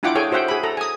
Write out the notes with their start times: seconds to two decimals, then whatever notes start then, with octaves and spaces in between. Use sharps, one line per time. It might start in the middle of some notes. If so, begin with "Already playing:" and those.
0.03 D4 E4 F4 F#5 G5 D6
0.15 G#4 A4 C#5 G5 G#5
0.32 F#4 C5 E5 F#5 G5
0.48 G#4 B5
0.63 A4 A#5
0.77 G#5 D#6